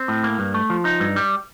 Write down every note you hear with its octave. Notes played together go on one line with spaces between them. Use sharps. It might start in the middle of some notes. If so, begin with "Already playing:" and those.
Already playing: C4
A2
A#3
G2
A3
F3
D#4
G2
G3